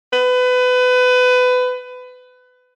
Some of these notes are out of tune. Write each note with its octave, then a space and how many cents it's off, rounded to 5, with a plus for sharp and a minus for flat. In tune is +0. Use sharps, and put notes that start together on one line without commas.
B4 +25